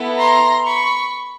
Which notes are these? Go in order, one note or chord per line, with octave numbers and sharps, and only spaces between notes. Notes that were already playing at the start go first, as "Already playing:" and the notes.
Already playing: B3 E4 A4
A#5 C6
B5 C#6